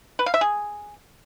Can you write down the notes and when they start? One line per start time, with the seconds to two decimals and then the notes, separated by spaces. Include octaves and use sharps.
0.19 B4
0.26 F5
0.34 E5
0.41 G#4